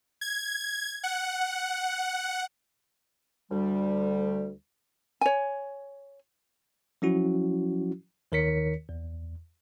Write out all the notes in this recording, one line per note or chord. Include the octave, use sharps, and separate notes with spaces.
G#6
F#5
D2 G3
C#5 G#5
F3 F#3 C#4 E4 F#4
D#2 D#3 A#4 C#5 B6 C#7
E2